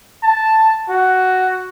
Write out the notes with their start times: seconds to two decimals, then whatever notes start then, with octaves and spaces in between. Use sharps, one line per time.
0.23 A5
0.89 F#4